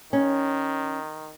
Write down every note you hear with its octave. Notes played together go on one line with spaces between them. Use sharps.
D#3 C#4